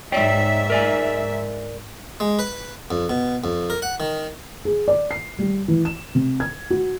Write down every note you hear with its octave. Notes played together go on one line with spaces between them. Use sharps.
G#2 C#5 D5 E5 G5
A#4 D5 G#5
G#3
B4
F2
B2
F2
A#4
F#5
D#3
G#4
D5
C7
G3
E3
E7
C3
G#6
F#4